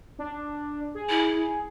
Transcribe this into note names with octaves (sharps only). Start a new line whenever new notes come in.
D4
G#4
E4